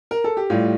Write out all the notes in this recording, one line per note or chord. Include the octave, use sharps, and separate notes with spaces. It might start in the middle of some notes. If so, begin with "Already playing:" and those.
A#4
A4
G4
A2 G3 F4